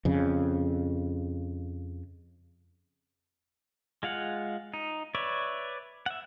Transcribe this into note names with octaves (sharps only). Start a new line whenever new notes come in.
F2 C#3
G#3 F4 F5 F#5
D#4
B4 C#5 D5 E5
E5 F#5